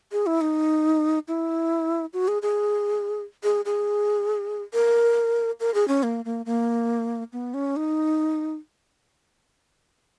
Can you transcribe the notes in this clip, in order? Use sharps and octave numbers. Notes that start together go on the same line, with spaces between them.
G#4
E4
D#4
E4
F#4
G#4
G#4
G#4
G#4
A#4
A#4
G#4
C#4
A#3
A#3
A#3
B3
C#4
D#4